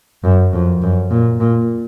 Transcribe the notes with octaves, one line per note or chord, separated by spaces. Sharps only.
F#2
F2
F#2
A#2
A#2